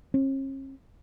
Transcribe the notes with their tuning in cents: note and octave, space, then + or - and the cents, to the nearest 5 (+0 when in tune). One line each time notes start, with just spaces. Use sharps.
C#4 -45